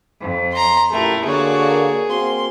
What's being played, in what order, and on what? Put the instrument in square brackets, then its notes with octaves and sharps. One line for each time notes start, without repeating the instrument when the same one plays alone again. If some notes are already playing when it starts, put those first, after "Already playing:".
[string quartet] F2
[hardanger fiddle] A#5 C6
[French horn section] F#2 A#2 G4 [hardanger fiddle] A3 [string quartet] E4 A#4
[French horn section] D3 A#3 [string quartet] F#4 C#5 D5 [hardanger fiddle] G#4
[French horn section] A#3 C4 F#4 [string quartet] C6